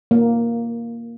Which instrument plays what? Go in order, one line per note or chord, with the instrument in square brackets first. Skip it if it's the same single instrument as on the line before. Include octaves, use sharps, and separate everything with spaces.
[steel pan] A#3